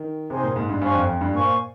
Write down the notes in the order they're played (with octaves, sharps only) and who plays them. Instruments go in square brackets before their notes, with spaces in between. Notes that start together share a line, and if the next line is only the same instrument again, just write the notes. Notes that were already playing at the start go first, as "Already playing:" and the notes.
Already playing: [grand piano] D#3
[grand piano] C3 [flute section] D#4 G#4 C5
[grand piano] A#2
G#2
G2
[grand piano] G2 [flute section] C5 F5 G#5 C#6
[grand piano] F2
F2
G2
[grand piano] A#2 [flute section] C5 F5 G#5 C#6